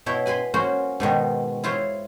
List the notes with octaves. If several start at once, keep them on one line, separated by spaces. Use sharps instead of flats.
B2 E4 C#5 G5
B4 G#5 B5 C6
A#3 C#4 F#4 C5
G#2 B2 D#3
E4 F4 C5 C#5